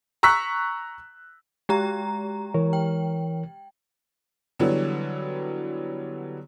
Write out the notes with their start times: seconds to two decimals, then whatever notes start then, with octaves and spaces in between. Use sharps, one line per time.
0.23 A#5 C#6 E6 F#6 B6
1.69 G#3 G4 A#5
2.54 E3 A#4 C#5
2.73 G5
4.59 D3 E3 F#3 G3 B3